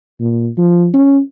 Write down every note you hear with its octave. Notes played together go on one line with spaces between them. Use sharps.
A#2
F3
C#4